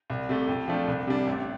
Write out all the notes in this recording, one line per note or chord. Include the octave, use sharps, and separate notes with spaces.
C2
C3 A3
F2
F3 A3 D4
C2
C3 G3 D4
A1